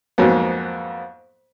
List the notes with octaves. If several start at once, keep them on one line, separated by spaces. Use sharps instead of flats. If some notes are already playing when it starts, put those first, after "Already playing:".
F2 G#2 F#3 A#3 B3